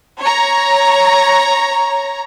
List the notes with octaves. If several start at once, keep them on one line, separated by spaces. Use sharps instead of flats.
C#5 A#5